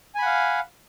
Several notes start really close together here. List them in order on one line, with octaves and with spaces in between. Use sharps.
G#5 B5 F#5 F5